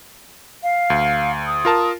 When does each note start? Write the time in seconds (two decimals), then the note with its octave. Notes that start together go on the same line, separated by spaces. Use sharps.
0.63 F5
0.90 D2
1.47 D#6
1.65 F4 A#4 A5